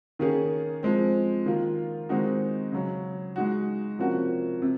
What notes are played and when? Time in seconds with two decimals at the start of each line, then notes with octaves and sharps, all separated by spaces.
0.19 D#3 A#3 C#4 G#4
0.83 F3 G#3 C4
1.46 D#3 A#3 F4
2.09 D#3 G#3 C4 D#4 F#4
2.72 C#3 F#3 C#4
3.36 G#3 D#4 F#4
3.99 C3 F3 A#3 C#4 F#4
4.62 C3